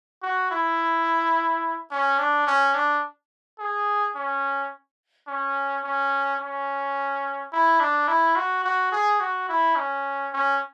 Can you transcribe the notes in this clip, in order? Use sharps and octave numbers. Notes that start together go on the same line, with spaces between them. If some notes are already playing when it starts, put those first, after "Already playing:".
F#4
E4
C#4
D4
C#4
D4
G#4
C#4
C#4
C#4
C#4
E4
D4
E4
F#4
F#4
G#4
F#4
E4
C#4
C#4